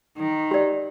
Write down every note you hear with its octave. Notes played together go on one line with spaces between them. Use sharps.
D#3
G4 D5